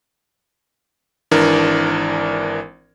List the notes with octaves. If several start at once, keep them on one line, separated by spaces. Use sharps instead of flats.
G#1 E3 D4 A#4 D5